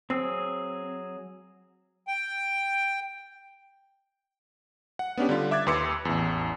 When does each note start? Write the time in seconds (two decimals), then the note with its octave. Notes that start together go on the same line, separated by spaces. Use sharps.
0.10 F#3 C4 G#4 E6
2.07 G5
4.99 F#5
5.17 B3 C#4 D4 G4
5.29 D3 G3 F4
5.51 E5 D6 F#6 G#6 A6
5.67 D#2 B4 C6 D6 E6 C#7
6.05 A1 E2